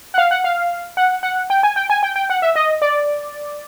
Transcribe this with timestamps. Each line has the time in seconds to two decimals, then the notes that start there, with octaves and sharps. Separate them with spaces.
0.14 F#5
0.18 F5
0.31 F#5
0.44 F5
0.97 F#5
1.23 F#5
1.50 G5
1.63 G#5
1.76 G5
1.90 G#5
2.03 G5
2.16 G5
2.30 F#5
2.42 E5
2.56 D#5
2.82 D5